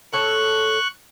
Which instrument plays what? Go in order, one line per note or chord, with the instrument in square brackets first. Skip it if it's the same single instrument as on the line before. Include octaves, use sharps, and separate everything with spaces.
[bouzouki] A2 A4 C#5 [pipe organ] C#6 F#6